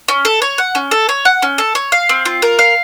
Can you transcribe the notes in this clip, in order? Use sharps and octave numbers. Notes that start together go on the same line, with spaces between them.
C#4
A4
C#5
F#5
C#4
A4
C#5
F#5
C#4
A4
C#5
F5
C4
F4
A#4
F5